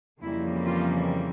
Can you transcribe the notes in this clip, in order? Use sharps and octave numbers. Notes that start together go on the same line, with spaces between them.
F2 C#3 E3 G3 A#3 E4
F4